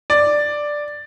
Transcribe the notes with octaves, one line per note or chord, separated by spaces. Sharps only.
D5